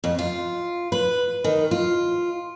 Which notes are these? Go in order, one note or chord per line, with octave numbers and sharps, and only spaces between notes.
F2
F4
B4
D#3
F4